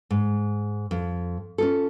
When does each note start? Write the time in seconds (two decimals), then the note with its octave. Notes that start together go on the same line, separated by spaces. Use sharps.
0.11 G#2
0.91 F2
1.58 C#4 F4 A4